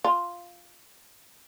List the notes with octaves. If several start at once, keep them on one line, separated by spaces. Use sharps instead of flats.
F4